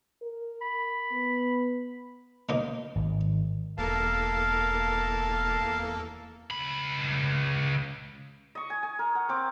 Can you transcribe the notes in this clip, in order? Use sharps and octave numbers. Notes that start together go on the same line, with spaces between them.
A#4
B5
B3
B2 A#3 D#4
G#1
E1 E2 A#3 A4 A#4 F5 A5
C#2 B5
D#5 C#6
G#5
G#5
A#4
F#5
C4 D6